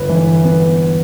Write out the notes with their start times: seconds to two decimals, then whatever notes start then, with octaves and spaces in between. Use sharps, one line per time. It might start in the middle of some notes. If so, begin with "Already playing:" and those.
Already playing: G1 B4
0.09 E3
0.44 B3